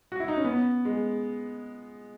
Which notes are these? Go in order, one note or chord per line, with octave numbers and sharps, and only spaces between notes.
F#4
E4
D#4
C#4
B3
G#3